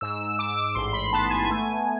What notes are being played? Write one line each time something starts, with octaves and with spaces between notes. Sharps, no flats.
G#2 E6
G#2 D6
A1 C6
B5
B3 A5
G#5
A3 G#5